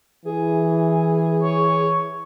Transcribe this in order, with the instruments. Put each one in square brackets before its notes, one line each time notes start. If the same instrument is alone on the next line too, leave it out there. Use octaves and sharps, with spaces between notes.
[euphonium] E3 [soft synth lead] G#4
[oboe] C#5